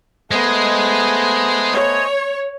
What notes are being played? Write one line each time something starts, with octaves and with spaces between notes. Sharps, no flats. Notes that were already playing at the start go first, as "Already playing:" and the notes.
G#3 A3 B3 C5 D#5 G#5
C#5